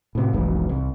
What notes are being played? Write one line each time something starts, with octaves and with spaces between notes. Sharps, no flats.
A2 C3
F1 B1 G#2 E3
C2